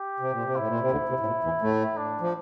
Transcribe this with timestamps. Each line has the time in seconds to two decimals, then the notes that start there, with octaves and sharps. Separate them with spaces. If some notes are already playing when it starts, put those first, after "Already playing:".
Already playing: G4
0.20 C3
0.31 A#2
0.44 C3
0.56 A2 E4
0.68 A#2
0.80 C3
0.91 D2 D3
1.09 C3
1.20 A2
1.26 A#2
1.44 E2 E3
1.62 A2 A3
1.97 D4
2.21 F3